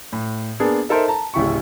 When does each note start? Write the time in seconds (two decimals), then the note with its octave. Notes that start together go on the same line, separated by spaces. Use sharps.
0.12 A2
0.60 A#3 B3 D4 G#4 A5
0.89 D#4 A4 A#4 C5 E5
1.08 A5 A#5
1.34 D1 A1 C#3 E4 G4 C#6